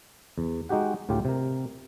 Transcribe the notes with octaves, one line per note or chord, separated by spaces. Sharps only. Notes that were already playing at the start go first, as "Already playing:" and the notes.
E2
G#3 D#4 F#4 G4 F#5
D2 A2 F4 G4 G5
C3 A#4